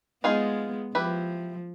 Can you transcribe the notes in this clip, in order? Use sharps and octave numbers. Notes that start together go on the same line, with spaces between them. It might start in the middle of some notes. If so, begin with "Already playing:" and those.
G#3 B3 D#4 F4 G#4
F3 E4 G4 B4